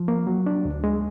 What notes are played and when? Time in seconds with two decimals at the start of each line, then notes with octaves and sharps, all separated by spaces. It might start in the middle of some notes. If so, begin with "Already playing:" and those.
Already playing: F3
0.08 A#3
0.27 F#3
0.46 D4
0.65 D2
0.84 G#3